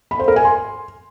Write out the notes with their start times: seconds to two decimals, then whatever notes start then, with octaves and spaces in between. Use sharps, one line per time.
0.11 B5
0.19 C5
0.28 A#4
0.36 G#5
0.45 C6